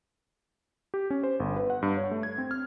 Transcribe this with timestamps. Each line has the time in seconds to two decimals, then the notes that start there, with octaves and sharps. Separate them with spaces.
0.94 G4
1.10 C#4
1.23 C5
1.40 G1
1.56 B4
1.70 F#5
1.82 G2
1.97 C#5
2.11 A3
2.23 G#6
2.38 C4
2.51 F6